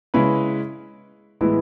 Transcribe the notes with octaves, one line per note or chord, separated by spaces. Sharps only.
C#3 G#3 C#4 E4 B4
A2 E3 G#3 B3 E4